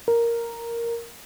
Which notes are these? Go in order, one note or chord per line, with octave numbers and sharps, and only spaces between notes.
A#4